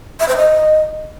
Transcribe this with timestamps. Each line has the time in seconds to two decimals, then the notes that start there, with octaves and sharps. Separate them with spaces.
0.20 E5
0.28 C5
0.37 D#5